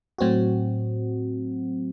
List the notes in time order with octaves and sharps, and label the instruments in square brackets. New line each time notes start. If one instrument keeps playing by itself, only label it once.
[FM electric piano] A2 F#3 C4 F#4